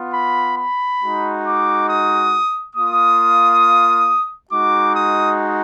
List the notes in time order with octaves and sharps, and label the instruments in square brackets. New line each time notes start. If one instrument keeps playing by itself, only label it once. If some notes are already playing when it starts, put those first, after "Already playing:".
Already playing: [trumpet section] B3 F4
B5
B5
G#3 D#4 F#4
D6
D#6
A#3 F4 D#6
G#3 D#4 F#4 D6
D#6